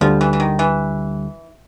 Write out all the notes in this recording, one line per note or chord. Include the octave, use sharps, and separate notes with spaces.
D2 D3 F3 G3
E3
E3
D#3
E3